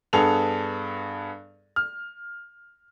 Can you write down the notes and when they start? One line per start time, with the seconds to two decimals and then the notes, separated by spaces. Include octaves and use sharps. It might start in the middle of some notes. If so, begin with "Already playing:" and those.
0.13 G2 B3 G#4 A4 F7
1.76 F6